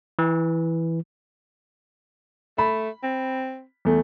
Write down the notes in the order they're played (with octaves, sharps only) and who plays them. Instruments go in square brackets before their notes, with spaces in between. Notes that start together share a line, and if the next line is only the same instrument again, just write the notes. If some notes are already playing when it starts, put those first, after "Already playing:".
[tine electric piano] E3
[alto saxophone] A3 [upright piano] B5
[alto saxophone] C4
[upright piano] E2 A3